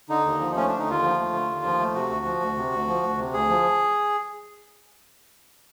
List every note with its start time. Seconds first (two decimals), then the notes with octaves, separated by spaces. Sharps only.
0.09 D3 D#4
0.25 D#2
0.41 F3
0.55 A3 C#4
0.68 D3 D4
0.79 D#4
0.86 D#2 F4
1.02 F3
1.18 A3
1.33 D3
1.49 D#2
1.64 F3
1.80 A3
1.94 C3 F#4
2.10 D2
2.25 F3
2.41 D2
2.56 C3
2.72 D2
2.87 F3
3.03 D2
3.18 C3
3.33 D2 G#4
3.49 F3